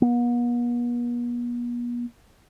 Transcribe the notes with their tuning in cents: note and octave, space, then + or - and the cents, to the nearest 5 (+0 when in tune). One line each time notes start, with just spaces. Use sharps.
B3 -45